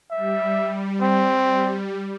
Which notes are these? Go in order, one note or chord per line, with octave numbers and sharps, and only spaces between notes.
G3 E5
C4